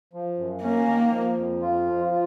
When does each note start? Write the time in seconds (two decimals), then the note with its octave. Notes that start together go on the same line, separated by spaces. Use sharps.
0.13 F3
0.38 F#2
0.63 A#3 C#4
0.88 D#3
1.12 F3
1.37 F2
1.62 F4
1.86 F3
2.11 F4